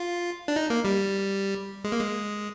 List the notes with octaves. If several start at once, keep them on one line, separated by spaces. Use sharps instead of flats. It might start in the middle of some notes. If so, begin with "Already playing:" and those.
Already playing: F4
D4
D#4
A#3
G3
G#3
A#3
G#3